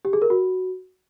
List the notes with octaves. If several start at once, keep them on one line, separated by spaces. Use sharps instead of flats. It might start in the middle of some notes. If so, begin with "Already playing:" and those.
G4
G#4
A#4
F#4